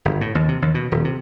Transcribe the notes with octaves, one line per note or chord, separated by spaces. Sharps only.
G1
A2
D#2
C3
D#2
B2
D#1
C3